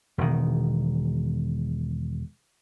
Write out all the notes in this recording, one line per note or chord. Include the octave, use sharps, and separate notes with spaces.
E1 B2 D#3